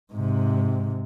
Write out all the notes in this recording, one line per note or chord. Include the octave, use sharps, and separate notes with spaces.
G#2 C3